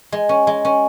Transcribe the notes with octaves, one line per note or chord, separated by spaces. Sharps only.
G#3
C#4
G#3
C#4